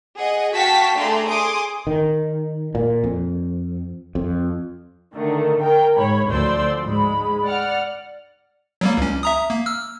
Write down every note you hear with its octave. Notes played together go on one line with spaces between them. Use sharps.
G#4 D#5 F#5
F#4 F5 G5 A5 C#6 B6
A3 D4 G#4 D5 A#5 C6
G#4 C6 D6 D#6 D7
D#3
A#2
F2
F2
D3 D#3 A3
A#4 G5
G#2 C#5 B5
D2 F3 C5 D5 C6 E6
G#2 G#3 B5
D5 F#5 F6
F#3 G3 A#3
C#2 C#4
E5 A#5 D#6
A#3
E6 F6